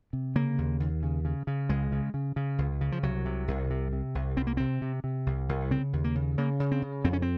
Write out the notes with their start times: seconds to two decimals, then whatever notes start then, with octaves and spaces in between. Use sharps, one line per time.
0.13 C3
0.35 C#3 A#3
0.58 D#2
0.80 D#2
1.03 C#3
1.25 C#3
1.47 C#3
1.69 C#2 G#3
1.92 C#3
2.14 C#3
2.36 C#3
2.58 C#2
2.81 C#3
2.92 F3
3.03 C2 F#3
3.25 C3
3.48 C2
3.70 C3
3.93 C3
4.15 C2
4.37 C2 C4
4.47 A#3
4.57 C3 C4
4.82 C3
5.04 C3
5.26 C2
5.49 C2
5.71 C#3 C4
5.93 D#2
6.04 A#3
6.15 C#3
6.38 C#3 A#3
6.60 C#3
6.72 C4
6.82 C#3
7.04 F2 C4
7.13 C#4
7.22 C4